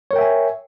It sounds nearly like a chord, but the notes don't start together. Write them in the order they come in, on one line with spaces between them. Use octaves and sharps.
C#5 A#4 G5 E5 G#5